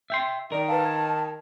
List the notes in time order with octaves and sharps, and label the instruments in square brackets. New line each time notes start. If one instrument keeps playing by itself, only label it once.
[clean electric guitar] E5 G5 C6
[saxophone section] D#3 [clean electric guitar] A#4 [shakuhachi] D5
[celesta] B4 F5 [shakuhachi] A5
[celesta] G#6